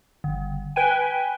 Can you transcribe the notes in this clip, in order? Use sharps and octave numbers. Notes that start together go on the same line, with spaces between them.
G1
B4 G5 G#5